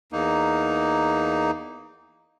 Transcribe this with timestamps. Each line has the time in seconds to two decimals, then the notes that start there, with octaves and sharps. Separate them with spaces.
0.12 E2 A#3 D#4